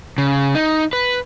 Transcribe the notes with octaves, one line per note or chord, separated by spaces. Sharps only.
C#3
D#4
B4